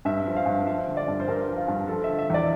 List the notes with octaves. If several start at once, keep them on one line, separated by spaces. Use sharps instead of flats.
G2 E5
F3
F5
G2
F3 E5
D3
D5
G2
C5
G2 A#4
F3
F4
G2
F3 A4
D3 E5
E5
E2 D5